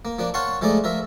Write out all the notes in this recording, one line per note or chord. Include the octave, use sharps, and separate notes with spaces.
A#3
F3 A#3 D4
C#5 F5 F#5 A5 C6 C#6
F3 G#3 A3 D#4 D5
F3 A#4 E5